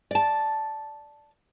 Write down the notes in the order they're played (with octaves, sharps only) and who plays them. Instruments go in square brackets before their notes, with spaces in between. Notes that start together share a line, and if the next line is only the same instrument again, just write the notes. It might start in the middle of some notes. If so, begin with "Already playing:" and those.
[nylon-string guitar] D5 A5